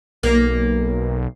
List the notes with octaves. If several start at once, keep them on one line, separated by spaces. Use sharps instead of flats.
B1 A#3